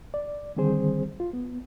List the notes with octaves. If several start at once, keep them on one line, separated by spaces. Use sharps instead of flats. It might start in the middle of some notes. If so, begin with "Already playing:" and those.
D5
D3 D#3 G3 C4 G#4 C5
F4
B3